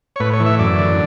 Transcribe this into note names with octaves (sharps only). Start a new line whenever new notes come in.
C#5
A2 B4
C#5
E3
E5
F#2 D5
D3